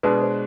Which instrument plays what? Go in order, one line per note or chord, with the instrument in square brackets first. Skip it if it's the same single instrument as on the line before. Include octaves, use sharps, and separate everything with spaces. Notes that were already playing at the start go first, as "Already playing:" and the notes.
[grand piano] B2 G#3 D4 [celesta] B4
[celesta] C5